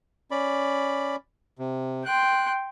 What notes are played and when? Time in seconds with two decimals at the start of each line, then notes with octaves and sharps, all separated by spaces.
0.31 C#4 D5 B5
1.59 C3
2.06 G5 C6 F#6